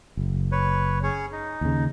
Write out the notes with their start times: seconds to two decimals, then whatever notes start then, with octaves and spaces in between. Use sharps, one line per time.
0.17 F#1
0.52 B4 C#5
1.03 C#4 G#4 C#5
1.32 D#4
1.61 D#2 C#3